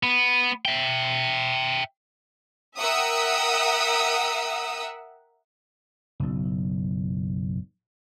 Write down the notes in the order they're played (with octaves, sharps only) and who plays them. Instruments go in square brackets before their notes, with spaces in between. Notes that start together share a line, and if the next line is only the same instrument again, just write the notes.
[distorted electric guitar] B3
E5 G5
[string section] A#4 E5 F#5 G5 D#6 E6
[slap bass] F#1 B1